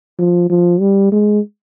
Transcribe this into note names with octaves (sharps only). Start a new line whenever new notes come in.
F3
F3
G3
G#3